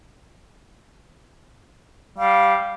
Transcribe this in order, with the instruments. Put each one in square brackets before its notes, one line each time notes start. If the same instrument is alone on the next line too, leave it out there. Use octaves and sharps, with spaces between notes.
[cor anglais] G3 [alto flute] F5